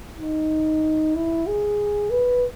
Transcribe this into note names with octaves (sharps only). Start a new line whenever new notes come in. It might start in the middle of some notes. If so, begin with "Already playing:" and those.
D#4
E4
G#4
B4